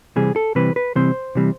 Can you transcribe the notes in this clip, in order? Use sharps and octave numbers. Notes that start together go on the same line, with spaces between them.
C3 E3 G3 C4 G#4
A4
C3 E3 G3 C4 B4
B4
C3 E3 G3 C4 C5
C3 E3 G3 C4